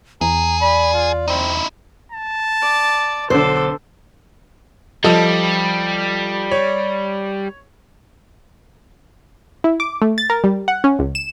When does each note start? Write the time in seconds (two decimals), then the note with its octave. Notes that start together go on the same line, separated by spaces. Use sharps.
0.21 E2 G#4 A#5
0.61 D5 B5
0.94 F4
1.28 C4 D#4 E4
2.12 A5
2.62 D5
3.30 B1 D3 A4 C5 D6
5.04 F3 G3 A4 D#5
6.51 C#5
9.64 E4
9.80 D6
10.02 A3
10.18 A6
10.30 A#4
10.44 G3
10.68 F#5
10.84 C#4
10.99 C#2
11.15 E7